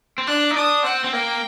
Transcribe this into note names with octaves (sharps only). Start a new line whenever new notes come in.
C4
D4 F#6
D#4
D4 D#6
C4 F#5
C4
A#3 G5